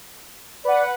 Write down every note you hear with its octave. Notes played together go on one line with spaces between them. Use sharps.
B4 D5 F#5